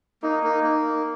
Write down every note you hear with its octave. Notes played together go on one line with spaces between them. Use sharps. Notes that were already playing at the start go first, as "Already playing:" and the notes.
A#3 D#4
A#3
A#3